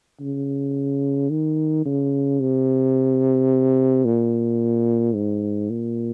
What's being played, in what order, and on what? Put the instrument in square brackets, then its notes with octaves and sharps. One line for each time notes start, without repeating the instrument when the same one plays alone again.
[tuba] C#3
D#3
C#3
C3
A#2
G#2
A#2